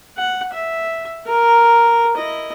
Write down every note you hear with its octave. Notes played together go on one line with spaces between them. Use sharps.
F#5
E5
A#4
E4 D#5